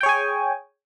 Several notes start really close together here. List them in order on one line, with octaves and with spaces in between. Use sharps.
G5 C#5 G#4 G#5